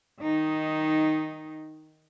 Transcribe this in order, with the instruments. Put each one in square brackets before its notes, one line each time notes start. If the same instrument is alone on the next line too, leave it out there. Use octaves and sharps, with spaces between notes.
[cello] D#3 D#4